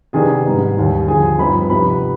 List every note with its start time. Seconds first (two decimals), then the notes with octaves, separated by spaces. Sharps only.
0.13 C3 D#3 B3 D4 G#4 G#5
0.45 G#2 G3 B3 D#4
0.76 D#2 D#3 G3
1.08 D#2 D3 F3 G#4 G#5
1.38 G2 F3 C4 D#4 B4 B5
1.70 C3 F3 B3 D#4 B4 B5